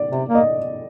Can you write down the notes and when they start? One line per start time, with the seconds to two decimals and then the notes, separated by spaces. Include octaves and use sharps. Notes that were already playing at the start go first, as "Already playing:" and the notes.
Already playing: D5
0.11 C3
0.28 A#3
0.35 D#5